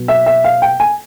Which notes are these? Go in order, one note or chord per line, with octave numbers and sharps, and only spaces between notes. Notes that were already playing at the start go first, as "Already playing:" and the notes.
Already playing: B2 F#3 B3
E5
E5
F5
G5
G#5